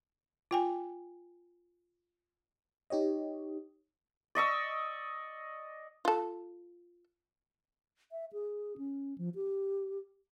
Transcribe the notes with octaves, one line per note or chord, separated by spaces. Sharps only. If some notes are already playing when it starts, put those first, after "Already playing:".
F4 G5 G#5
D#4 G4 C#5 D#5
D5 D#5 C#6 E6
F4 A4
E5
G#4
C#4
F3
G4